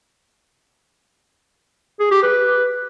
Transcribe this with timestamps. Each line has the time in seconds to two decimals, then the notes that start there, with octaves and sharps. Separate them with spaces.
2.00 G#4
2.11 G4
2.23 B4